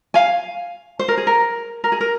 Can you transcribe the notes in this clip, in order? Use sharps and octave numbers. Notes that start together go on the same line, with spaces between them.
F5 G#5
C5
A#4
G#4
A#4
A#4
G#4
A#4